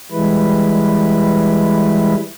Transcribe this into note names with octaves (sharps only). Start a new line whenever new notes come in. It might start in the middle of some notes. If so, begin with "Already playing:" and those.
E3 G3 G#3 E4 B4